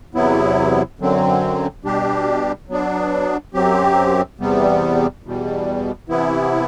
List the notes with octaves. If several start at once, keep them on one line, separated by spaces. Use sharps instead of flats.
E2 C3 F#3 B3 E4
F#2 D3 F#3 C4
B2 G3 D4 G4
F#3 B3 D4
F#2 F#3 C4 G4
E2 C3 G3 B3
E2 B2 G3
C3 E3 B3 E4